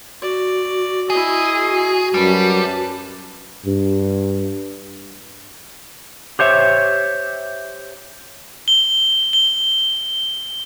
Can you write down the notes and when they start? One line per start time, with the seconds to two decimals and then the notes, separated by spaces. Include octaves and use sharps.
0.22 F#4 D5
1.10 E4 G#4 D#5
2.14 F#2 G3 B4 A5
3.66 G2
6.39 G4 C5 C#5 E5
8.68 G7
9.33 G7